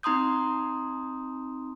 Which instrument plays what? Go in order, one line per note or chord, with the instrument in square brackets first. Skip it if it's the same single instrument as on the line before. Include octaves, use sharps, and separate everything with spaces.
[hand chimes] C4 D#4 A#5 C6 D#6 G6